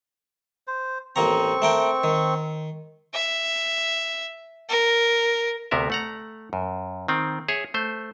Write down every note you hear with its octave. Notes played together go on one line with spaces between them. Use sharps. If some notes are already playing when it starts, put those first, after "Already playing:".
C5
A1 A#3 C4 A#5 C#6
A3 A#4 G5
D#3
E5
A#4
D2 C3 B3 A#4 E5
A3 F#5 A#5
F#2
D#3 C4
G#4 C#5 E5
A3 C5